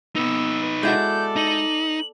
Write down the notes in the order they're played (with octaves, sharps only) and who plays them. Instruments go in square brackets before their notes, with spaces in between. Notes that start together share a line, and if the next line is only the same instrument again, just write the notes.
[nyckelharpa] B3 [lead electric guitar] D#4 B4 [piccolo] E6
[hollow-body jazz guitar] G#3 E4 F#4 [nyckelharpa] A4 D5 [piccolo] G6
[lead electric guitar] D#4 [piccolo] F#7